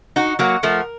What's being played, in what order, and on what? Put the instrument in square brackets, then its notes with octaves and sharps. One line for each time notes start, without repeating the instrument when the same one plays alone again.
[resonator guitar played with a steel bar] D#4 F#4 [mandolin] F#5
[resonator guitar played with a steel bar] F#3 A#3 [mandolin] F#5
[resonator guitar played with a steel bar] F3 A3 [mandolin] A#4